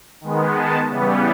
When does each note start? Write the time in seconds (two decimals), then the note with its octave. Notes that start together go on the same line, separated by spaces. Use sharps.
0.21 D#3 G#3 B3
0.55 A5
0.90 C#3 E3 G3 B3